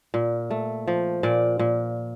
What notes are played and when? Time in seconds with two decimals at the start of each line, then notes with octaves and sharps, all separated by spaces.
0.14 A#2
0.50 A3
0.87 F3
1.23 A#2 D5
1.59 A#2